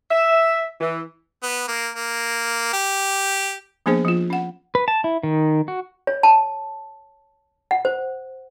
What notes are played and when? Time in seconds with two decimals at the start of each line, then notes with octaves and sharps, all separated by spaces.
0.11 E5
0.80 E3
1.43 B3
1.68 A#3
1.94 A#3
2.73 G4
3.86 F3 A#3 B3 D4 G#4 C5
4.05 F3 F4
4.30 C#4 F#5
4.75 B4
4.88 A5
5.04 E4
5.23 D#3
5.68 F#4
6.07 C#5
6.23 A5
7.71 F#5
7.85 C5